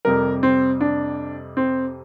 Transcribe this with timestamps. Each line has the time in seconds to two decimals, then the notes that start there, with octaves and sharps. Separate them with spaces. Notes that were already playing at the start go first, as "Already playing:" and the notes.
0.05 F2 C3 G3 A#4
0.43 C4
0.81 D4
1.57 C4